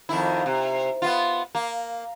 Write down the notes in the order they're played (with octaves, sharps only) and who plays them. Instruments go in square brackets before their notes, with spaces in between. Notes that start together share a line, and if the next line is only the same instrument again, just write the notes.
[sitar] F2 D#3 E4
C3
B3 F4
A#3